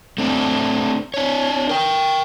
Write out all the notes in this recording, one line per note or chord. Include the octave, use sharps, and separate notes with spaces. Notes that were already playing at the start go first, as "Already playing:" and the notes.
A3 C4 D4
D4 C#5
A#4 G5